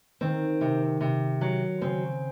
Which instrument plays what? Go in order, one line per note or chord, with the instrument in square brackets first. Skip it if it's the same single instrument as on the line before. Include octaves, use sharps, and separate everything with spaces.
[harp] D#3 [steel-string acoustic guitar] C4
[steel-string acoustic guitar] C3
C3
F#3
[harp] C#3 [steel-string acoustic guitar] C4